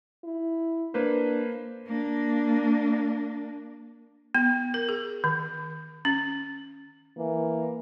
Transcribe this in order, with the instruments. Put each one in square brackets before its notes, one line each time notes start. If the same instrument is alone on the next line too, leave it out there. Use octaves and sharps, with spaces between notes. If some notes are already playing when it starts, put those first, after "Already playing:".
[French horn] E4
[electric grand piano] A#3 B4 C5 [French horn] D4
[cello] A#3 D4
[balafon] B3
A#4
G#4
D#3
C#4
[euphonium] E3 [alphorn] A#3